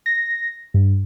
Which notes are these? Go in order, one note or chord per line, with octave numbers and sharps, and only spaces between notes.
A#6
G2